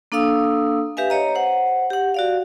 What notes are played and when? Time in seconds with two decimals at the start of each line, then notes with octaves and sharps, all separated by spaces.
0.12 A#3 D4 A4 F5 D#6 E6
0.97 G4 B4 E5 F5 G#5
1.10 C#5 D#5 A#5
1.35 C5 F#5
1.90 G4 F#5
2.14 F#4 D5 F5